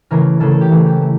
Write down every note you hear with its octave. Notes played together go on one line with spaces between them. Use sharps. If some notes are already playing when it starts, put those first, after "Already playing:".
C#3 E3 A3 A#4
C#3 E3 A3 A4
A4
G4
C#3 E3 A3
G4
A3